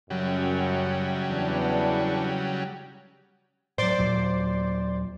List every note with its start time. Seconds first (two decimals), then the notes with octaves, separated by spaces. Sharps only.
0.10 F#2 C#3 F#3 G3
1.30 E2 B3 D4
3.78 A2 F#3 C5 D5
3.98 D#2 A#2 F#3